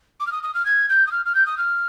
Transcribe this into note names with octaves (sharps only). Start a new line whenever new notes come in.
D6
F6
D#6
D#6
F6
G#6
G6
D#6
F6
F6
G6
D#6
F6